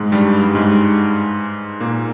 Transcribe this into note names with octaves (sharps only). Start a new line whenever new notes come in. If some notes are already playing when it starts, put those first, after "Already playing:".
Already playing: G#2 G#3
G2 G3
G3
G#2 G#3
A#2 A#3